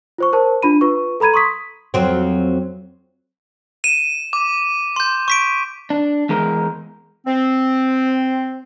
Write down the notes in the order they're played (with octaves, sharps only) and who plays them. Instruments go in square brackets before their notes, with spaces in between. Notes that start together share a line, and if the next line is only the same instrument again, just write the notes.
[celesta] F4 C5 C#6
A#4 C5 A5
D4 F4 B5 D#7
F4 B4 C#6
A4 A#5 B5 G#6 D#7
C6 C#6 D#6 B6
[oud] F2 F#3 C4
[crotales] D#7 [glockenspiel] E7
[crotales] D6
[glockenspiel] C6 G6
C#6 B6 D7
[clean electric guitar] D4
E2 G#3 A#4
[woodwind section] C4